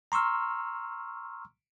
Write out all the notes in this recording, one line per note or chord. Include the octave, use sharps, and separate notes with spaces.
A#5 C6 C#6 E6 F6